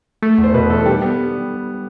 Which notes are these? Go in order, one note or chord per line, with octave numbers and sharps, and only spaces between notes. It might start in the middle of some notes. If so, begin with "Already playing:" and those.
A3
E2
C5
B2 B4
E2 A4
A4
G3 G4
B3